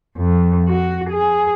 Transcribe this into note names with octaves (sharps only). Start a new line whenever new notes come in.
F2
F#4
G#4